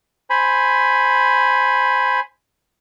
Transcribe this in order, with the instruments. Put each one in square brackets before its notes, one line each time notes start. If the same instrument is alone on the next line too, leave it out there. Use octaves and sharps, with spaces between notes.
[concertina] C5 G#5 B5